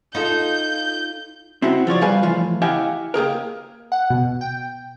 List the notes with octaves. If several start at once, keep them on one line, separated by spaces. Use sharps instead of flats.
D#4 F4 A4 G6
C4 E4 F#4
F3 F4 C#5 D5
C2 A#2 G3 B4 F5 G#5
A2 E3 F3 F4
E4 G4 D#5 F5 F#5 G#5
A#3 G4 G#4 A#4
F#5
B2
G5